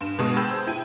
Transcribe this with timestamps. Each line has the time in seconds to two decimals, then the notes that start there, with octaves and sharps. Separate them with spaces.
0.01 G2 E7
0.19 B2 G#3 B3 A5 C#6 D#6
0.37 G#4 G5 A5 B5 E6 G6
0.49 C5
0.67 E4 G5 G#6 D#7